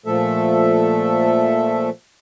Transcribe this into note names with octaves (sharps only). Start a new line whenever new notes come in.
A#2 F3 A3 A4 E5